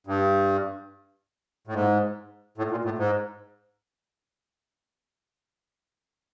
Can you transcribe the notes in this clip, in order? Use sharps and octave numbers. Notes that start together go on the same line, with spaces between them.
G2
A2
G#2
A2
A#2
A2
G#2